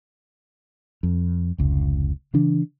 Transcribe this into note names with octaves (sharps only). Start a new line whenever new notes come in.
F2
F1 C#2
C#3 E3 D4